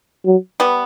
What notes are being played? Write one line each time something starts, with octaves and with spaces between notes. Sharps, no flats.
F#3
G3 B3